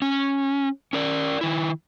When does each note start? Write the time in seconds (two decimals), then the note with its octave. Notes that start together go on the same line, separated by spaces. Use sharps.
0.02 C#4
0.93 C#4 A#4 D5
1.41 D#3 E4